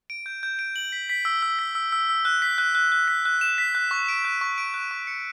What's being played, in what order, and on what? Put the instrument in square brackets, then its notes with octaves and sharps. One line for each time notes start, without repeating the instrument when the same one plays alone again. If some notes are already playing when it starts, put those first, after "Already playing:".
[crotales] D7
G6
G6
D7
F#7
B6
B6
E6
E6
B6
E6
E6
E6
F#6
B6
F#6
F#6
F#6
B6
F#6
E7
B6
F#6
C#6
D7
F#6
C#6
D7
F#6
C#6
C#7